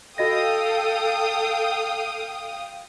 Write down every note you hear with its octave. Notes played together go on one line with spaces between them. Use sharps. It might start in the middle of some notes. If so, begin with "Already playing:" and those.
F#4 A4 D#5 F5 G5 D#6 A#6